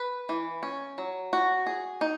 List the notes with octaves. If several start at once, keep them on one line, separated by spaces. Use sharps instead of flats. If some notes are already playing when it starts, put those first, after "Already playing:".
Already playing: B4
E3
C#4
F#3
F#4
G#4
D#4